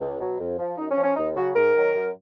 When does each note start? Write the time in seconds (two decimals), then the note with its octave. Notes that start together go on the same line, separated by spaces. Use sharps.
0.01 C#2
0.20 B2 F#3
0.40 F2
0.59 F3
0.78 F#2 D#4
0.91 C#4
0.97 F3
1.04 C#4
1.16 D#2 D#4
1.36 C#3 F#3 F#4
1.55 G#2 A#4
1.75 D#3 F#3
1.94 F#2